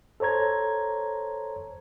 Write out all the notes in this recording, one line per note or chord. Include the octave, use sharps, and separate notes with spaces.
A4 C5 C#5 A#5 G#6